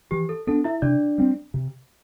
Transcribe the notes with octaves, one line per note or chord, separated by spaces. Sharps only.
E3 G4
A4
B3 D4 A4
E4 E5
C3 D4 D5
G3 C4
C3